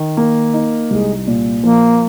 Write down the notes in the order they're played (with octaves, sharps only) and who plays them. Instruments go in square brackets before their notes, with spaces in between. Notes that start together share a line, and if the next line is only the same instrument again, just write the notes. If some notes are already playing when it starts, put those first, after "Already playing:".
Already playing: [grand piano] D#3
A#3
D#4
[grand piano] C2 [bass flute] G#3
[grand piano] A#2
[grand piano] F3 [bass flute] A#3